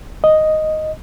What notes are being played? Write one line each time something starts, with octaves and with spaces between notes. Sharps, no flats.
D#5